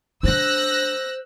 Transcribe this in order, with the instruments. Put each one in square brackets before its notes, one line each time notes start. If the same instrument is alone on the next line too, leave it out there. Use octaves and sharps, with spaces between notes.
[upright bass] G#3 D4 [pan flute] C5 [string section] E6 F#6 A#6